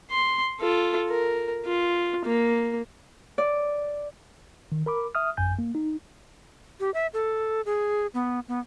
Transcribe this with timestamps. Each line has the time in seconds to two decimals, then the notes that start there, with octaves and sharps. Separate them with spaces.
0.11 C6
0.60 F4 A4
1.09 A#4
1.66 F4
2.26 A#3
3.38 D5
4.72 D#3
4.86 A#4 B5 D6
5.15 E5 D#6 F6
5.37 A1 F#2 G#5 G6
5.59 A#3
5.75 D#4
6.80 G4
6.94 E5
7.14 A4
7.66 G#4
8.14 B3
8.48 B3